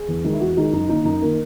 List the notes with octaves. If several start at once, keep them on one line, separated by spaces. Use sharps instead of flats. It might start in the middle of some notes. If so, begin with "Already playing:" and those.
Already playing: G#4
E2
D#3 G#3
E4
E2 F#4
D#3 G#3 D#4
F#2 D#4
D#3 A#3 D#4
F#2 D#4
D#3 A#3 A#4